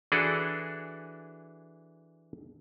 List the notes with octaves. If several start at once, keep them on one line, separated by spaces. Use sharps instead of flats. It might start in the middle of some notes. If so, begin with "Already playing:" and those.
E3 D4 E4 F#4 G#4 A4